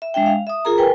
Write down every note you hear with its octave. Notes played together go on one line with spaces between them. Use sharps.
E5
G#3 D4 E5 G5
F5
E5 D#6
F4 G#4 A#4 A#5
A#4 B4 G5 G#5